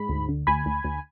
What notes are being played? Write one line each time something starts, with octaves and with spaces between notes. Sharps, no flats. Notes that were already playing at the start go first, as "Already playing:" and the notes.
Already playing: G#2 B5
D2
D3
D2 G#5 B5
D2
D2